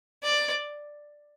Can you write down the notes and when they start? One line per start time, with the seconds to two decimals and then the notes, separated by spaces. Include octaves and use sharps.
0.23 D5